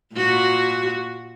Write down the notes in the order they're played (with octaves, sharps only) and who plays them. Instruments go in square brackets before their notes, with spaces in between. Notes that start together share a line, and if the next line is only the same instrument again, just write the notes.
[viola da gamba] A#2 F#4